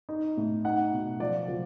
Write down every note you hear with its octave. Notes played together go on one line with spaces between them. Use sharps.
D#4
A2
D#4 F#5
B2
F3 D5
F3